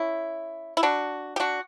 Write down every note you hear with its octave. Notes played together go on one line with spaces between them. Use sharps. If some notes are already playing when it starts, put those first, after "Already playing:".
Already playing: C#4 E4
E4
D4 F#4
G4
D4 F#4